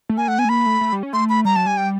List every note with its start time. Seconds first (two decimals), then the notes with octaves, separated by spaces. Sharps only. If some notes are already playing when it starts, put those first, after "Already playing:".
0.09 A3
0.17 A#3 G#5
0.28 A3 F#5
0.38 B3 G#5
0.45 A3
0.49 A#3 B5
0.66 A3
0.81 A3
0.92 G3
1.03 C#4
1.13 A3 C6
1.29 B5
1.45 G3 A#5
1.56 F#3 A5
1.66 G3 G#5
1.77 G5